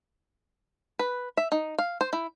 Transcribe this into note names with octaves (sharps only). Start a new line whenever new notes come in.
B4
E5
D#4
F5
C5
E4